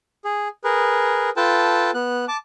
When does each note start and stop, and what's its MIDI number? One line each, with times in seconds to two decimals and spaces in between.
0.25 0.48 68
0.64 1.30 68
0.64 1.30 70
0.64 1.30 71
1.37 1.91 65
1.37 1.91 69
1.37 1.91 71
1.37 1.91 79
1.37 1.91 81
1.94 2.25 59
1.94 2.25 90
2.28 2.37 81
2.28 2.37 86